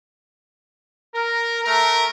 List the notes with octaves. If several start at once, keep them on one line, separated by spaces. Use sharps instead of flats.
A#4
A3 A#4